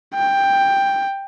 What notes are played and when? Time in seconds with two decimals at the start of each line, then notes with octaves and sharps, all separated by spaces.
0.15 G5